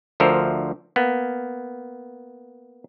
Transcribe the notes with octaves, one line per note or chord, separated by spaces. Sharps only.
D2 F3 A4 A#4 C5
A#3 B3